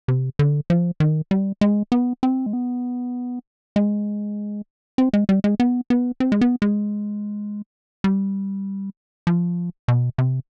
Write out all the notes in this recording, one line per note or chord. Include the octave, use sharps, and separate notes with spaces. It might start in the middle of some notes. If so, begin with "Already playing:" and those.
C3
D3
F3
D#3
G3
G#3
B3
C4
G#3
B3
G#3
C4
G#3
G3
G#3
B3
B3
C4
G#3
B3
G#3
G3
F3
B2
C3